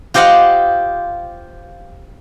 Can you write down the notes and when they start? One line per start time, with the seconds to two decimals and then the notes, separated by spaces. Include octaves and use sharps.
0.14 F4 G4 C5 D#5 F5 F#5